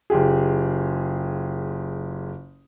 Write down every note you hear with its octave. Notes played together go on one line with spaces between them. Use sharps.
F#1 F4 G4 G#4